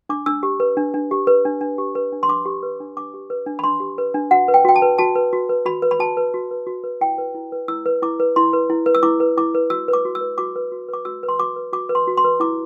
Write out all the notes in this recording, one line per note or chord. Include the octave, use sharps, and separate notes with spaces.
D4 D6
D4 E6
G4
B4
D4
D4
G4
B4
D4
D4
G4
B4
D4
C6
D4 D6
G4
B4
D4
D4 D6
G4
B4
D4
B5
D4 C6
G4
B4
D4
F#4 F#5
B4
G5
F#4 G5
A5
B4
F#4 A5
B4
F#4
B4
F#4 B5
B4
B5
F#4 A5
B4
F#4
B4
F#4
B4
E4 G5
B4
E4
B4
E4 E6
B4
E4 D6
B4
E4 C6
B4
E4
B4
E6
E4 D6
B4
E4 D6
B4
F#4 E6
B4
D6
F#4
E6
B4
F#4 D6
B4
F#4
B4 D6
F#4 E6
B4
C6
F#4 D6
B4
F#4 D6
B4
C6
F#4
C6
B4
E4 D6